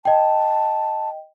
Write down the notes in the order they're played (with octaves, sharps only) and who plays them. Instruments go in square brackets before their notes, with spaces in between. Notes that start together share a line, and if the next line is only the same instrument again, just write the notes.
[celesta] D#5 G5 [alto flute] A5